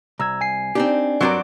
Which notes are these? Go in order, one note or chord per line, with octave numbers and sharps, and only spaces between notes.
C2 A#5 E6 G#6
G#5 C7
C4 D4 D#4 G4
G2 F#3 C4 F#4 A#4 D5